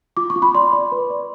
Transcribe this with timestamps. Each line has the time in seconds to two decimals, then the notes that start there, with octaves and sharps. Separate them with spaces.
0.17 F4 D6
0.30 C#6
0.36 F4
0.42 B5
0.55 D5 C6
0.73 D5
0.92 B4
1.10 D5